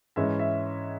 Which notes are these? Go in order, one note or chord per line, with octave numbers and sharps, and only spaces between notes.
G#2 E3 G#3 C#4 E5
E5